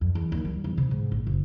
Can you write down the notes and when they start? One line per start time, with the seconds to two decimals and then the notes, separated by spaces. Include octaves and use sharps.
0.01 F2
0.15 E2
0.32 D#2
0.45 G3
0.64 E2
0.78 C3
0.91 G#2
1.12 A#1
1.27 F#1